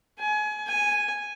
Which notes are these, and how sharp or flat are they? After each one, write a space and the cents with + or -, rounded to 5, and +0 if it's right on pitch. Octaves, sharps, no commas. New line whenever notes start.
G#5 +30
G#5 -5